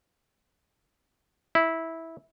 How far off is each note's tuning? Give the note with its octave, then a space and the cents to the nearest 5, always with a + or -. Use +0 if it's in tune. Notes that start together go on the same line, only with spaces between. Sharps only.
E4 -10